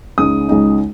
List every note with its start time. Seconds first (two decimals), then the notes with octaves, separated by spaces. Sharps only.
0.18 C#2 C#3 G#3 D#4 D#6
0.49 C#2 C#3 G#3 D#4